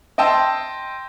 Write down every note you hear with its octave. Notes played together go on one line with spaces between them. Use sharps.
D#5 G5 A5 C6 E6